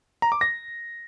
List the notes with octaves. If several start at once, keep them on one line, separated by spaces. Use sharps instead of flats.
A#5
D6
A#6